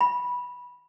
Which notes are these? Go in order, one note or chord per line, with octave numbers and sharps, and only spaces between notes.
B5